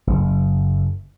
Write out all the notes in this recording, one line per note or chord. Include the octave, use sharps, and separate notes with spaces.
F#1